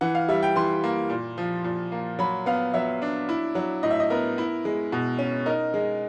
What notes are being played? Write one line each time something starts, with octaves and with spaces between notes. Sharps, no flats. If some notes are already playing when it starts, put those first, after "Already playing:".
E3 F#5
F5
G3 E5
G5
E3 C6
A#3
A#2
F3
A#2
A#3
F#3 B5
B3 F5
F#3 E5
D4
E4
F#3
A2 D#5
E5
D#5
B3 A#4
E4
G#3
B2
C#4
D#4 A#4
G#3